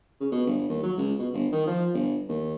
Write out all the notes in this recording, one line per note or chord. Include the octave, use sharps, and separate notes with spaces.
C#3
B2
G1
D#2
F#3
C#2
B2
G1
D#3
F3
G1
D#2